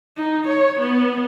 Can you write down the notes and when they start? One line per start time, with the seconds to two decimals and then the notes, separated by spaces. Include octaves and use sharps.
0.17 D#4
0.48 C#5
0.79 B3